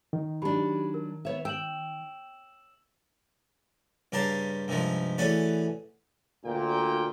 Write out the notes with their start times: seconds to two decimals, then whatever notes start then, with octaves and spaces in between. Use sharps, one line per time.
0.13 D#3
0.42 F#3 D4 D#4 G4 B5
0.94 A#4
1.25 B3 C#5 E5
1.45 G5 E6 E7 F#7
4.12 G2 C#3 G4 A#4 A5 C6
4.68 G2 C3 D#3 F3 G#3
5.18 E3 A3 C#4 F#4 G#4 D5
6.44 D2 A#2 G5